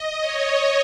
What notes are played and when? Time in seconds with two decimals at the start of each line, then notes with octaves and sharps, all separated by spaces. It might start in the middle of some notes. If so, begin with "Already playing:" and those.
Already playing: D#5
0.20 C#5